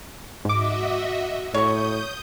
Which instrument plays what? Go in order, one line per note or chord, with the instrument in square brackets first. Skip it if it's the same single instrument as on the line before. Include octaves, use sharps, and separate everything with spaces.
[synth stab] G#2 D6 [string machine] F#4 D#5 E5
[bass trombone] A2 [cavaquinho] C#5 C#6 [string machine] D#6 G6